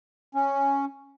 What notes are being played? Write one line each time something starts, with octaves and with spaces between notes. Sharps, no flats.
C#4